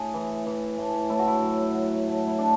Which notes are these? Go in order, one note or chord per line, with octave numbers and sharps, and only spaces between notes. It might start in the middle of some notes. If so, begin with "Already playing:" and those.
Already playing: A2 G#4
E3
E3
A2
A2 E4
F#4
E4
F#3
F#3
A2
E4
A2 D4